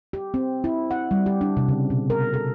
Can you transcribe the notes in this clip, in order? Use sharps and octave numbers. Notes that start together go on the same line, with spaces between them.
G4
C4
E4
F#5
G3
G4
D4
C3
C#3
B2
A#4
A4